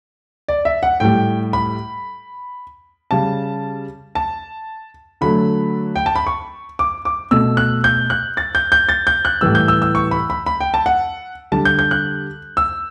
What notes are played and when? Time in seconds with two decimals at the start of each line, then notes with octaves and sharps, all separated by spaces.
0.48 D5
0.65 E5
0.83 F#5
1.00 A2 G3 G5
1.53 B5
3.11 C#3 G3 A5
4.15 A5
5.21 D3 F#3 A3 B5
5.96 G5
6.06 A5
6.16 B5
6.27 C#6
6.79 D6
7.05 D6
7.31 B2 A3 E6
7.57 F#6
7.84 G6
8.10 F#6
8.37 A6
8.55 G6
8.72 G6
8.89 A6
9.07 G6
9.25 F#6
9.41 A2 E3 G3 E6
9.55 G6
9.68 E6
9.82 E6
9.95 C#6
10.11 B5
10.30 B5
10.46 B5
10.61 G5
10.74 A5
10.86 F#5
11.52 D3 G3 A5
11.65 G6
11.79 G6
11.91 F#6
12.57 E6